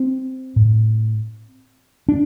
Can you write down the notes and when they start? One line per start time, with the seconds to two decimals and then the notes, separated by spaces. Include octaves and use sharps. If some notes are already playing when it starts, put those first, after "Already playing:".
Already playing: C4
0.56 A2
2.09 D4